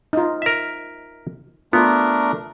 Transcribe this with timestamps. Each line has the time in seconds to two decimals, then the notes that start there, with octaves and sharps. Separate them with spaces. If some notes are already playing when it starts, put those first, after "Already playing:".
0.13 D#4 F4
0.42 A#4 E5
1.73 A3 B3 D4 F4 A#4